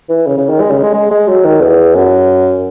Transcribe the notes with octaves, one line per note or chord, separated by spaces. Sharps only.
E3
C#3
C#3
D#3
G#3
C#3
G#3
G#3
G#3
F#3
D#3
E2
F#2